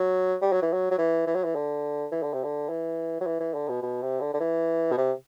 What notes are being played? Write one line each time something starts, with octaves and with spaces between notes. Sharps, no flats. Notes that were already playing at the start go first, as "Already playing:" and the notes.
Already playing: F#3
G3
F#3
E3
F#3
F#3
E3
E3
F#3
E3
D3
E3
D3
C3
D3
E3
F#3
E3
E3
D3
B2
B2
C3
D3
D3
E3
B2
C3